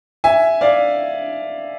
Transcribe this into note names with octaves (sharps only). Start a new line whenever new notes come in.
E5 G#5
D5 F5